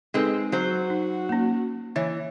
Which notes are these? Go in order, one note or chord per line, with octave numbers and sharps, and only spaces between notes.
G#3 C4 D#4 A4 B4
F#3 F#4 C5
D#4
A#3 C#4
E3 C#5